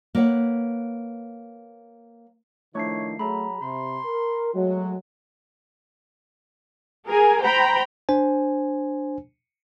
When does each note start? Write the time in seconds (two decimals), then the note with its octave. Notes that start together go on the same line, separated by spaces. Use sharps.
0.15 A#3 B4 C#5 E5 F#5
2.75 D#3 F3 A3 D4 E4 C#5 C7
3.19 F#3 A3 G#4 A#5 B5
3.62 C3 C6
4.05 A#4
4.54 F#3 G#3 A3 F#4
7.07 G#4 A#4 G#5
7.42 C5 G5 A#5 B5
8.09 D4 C5 G#5